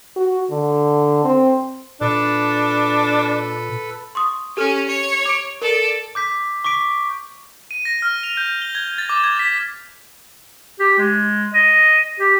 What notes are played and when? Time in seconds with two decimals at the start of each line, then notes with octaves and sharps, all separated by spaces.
0.16 F#4
0.51 D3
1.24 C4
2.01 A#2 D4 A4 B4
4.15 C6 C#6 D#6
4.57 C#4 G4 A4 G#5 F6
4.87 C#5
5.26 D6 D7
5.62 A4 A#4 D5
6.15 D6 G6 B6
6.65 C#6 D6 B6 D7
7.71 D#7
7.85 A#6
8.02 F6
8.23 F7
8.37 G6
8.62 G7
8.75 G#6
8.98 A6
9.09 D6
9.24 G#6
9.39 B6
10.80 G4
10.99 G#3
11.54 D#5
12.20 G4